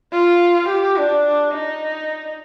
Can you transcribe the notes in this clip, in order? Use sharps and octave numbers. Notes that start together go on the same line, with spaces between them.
F4
G4
D4
D#4